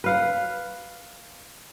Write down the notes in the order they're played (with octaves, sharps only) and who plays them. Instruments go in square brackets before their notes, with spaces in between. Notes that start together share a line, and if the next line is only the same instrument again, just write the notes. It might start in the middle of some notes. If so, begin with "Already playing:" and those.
[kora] B4 F5 F#5